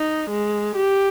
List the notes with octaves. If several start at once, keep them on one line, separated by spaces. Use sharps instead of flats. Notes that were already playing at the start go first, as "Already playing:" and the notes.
Already playing: D#4
G#3
G4